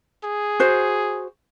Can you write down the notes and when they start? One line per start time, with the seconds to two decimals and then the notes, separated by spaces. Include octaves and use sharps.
0.24 G#4
0.60 F#4 C5